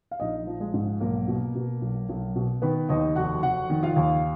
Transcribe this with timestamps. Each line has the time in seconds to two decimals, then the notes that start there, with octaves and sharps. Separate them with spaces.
0.11 F5
0.20 A#1 D#4 D#5
0.47 F3
0.60 G#3 G#4
0.74 G#2
1.00 B1 A#3 A#4
1.28 B2
1.55 B2
1.82 B1
2.09 B1
2.36 B2
2.62 D#3 B3 B4
2.89 D#2 D#4 D#5
3.16 F1 F#4 F#5
3.43 F1 F#4 F#5
3.70 D#3
3.83 F4 F5
3.96 D#2